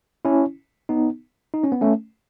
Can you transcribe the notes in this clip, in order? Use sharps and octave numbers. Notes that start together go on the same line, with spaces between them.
C#4 E4
B3 D#4
D#4
C#4
B3
A3 C#4